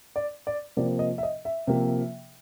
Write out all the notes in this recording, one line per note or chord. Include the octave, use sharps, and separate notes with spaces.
D5
D5
C3 F3 A#3 D5
D#5
E5
D#5
E5
C3 F3 A#3